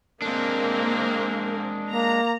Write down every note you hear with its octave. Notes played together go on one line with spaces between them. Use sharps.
G#3 A#3 C4 D4 A#4
A#3 A#5